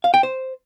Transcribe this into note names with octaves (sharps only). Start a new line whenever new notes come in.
F5
G5
C5